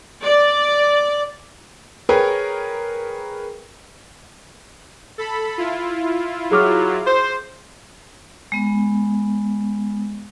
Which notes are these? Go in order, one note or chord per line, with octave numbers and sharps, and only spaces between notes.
D5
G#4 A#4 B4 C#5 G5
A4 B5
E4 F4
F#3 G#4 D6 F6
C5
G#3 B3